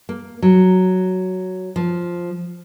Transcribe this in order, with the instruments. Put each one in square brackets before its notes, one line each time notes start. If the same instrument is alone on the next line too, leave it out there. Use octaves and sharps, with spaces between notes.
[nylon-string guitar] A#3
F#3
F3